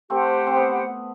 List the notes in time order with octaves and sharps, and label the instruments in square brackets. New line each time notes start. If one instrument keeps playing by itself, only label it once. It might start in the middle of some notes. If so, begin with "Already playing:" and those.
[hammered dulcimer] A3 C4 [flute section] G4 C5 F#5
[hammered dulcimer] C4
B3